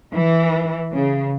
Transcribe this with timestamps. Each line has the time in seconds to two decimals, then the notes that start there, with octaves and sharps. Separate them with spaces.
0.14 E3
0.93 C#3